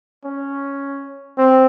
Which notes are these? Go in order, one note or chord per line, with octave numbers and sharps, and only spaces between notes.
C#4
C4